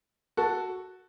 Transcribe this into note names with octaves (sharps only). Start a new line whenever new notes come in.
F#4 A4